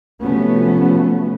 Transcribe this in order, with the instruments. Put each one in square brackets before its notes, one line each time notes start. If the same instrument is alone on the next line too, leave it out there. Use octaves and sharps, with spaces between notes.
[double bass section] C3 F3 F#3 A3 B3 C#4